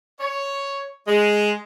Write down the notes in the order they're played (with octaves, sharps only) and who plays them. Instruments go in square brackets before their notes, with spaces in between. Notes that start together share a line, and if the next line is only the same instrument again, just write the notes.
[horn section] C#5
G#3